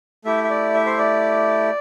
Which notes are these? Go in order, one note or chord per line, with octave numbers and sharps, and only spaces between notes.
A3 E4 G4 E5
E5
D5
E5
C5
D5